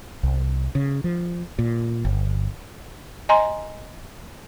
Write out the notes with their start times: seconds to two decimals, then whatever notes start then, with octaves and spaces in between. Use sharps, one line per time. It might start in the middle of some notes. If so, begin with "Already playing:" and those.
0.23 C2
0.75 C#3
1.04 F3
1.59 A#2
2.05 G1
3.29 D#5 G#5 A#5 C6